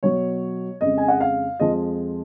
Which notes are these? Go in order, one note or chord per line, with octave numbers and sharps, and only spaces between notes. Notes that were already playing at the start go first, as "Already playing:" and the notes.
B2 F#3 C#5
F2 C#3 G#3 D#5
G#5
F#5
F5
F2 F3 G#3 D#5